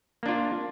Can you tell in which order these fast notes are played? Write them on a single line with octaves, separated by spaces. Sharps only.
A#3 D4 F4